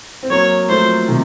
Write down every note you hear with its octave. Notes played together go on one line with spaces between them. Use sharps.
C4
F#3 A#3 C#5
F3 A3 C5
C3 D#3